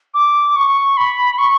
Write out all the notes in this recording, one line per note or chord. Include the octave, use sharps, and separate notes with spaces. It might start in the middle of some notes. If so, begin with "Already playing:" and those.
D6
C#6
B5
C#6